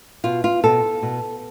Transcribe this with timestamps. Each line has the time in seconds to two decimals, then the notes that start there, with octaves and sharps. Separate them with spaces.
0.24 B2 F4
0.44 F4
0.64 B2 A4
1.02 B2